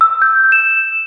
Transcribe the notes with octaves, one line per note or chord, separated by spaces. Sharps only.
E6
G6
E7